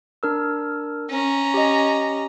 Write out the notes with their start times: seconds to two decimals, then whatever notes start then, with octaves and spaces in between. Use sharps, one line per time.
0.23 D4 A#4 E6
1.10 C#4 A#5
1.54 G4 D#5